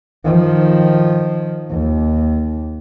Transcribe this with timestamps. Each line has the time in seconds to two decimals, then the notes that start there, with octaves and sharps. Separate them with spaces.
0.25 D#3 F3
1.71 D#2